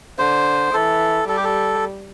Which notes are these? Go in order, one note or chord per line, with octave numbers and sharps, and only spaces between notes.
D3 C5
E3 A4
G3 A4
G4
A4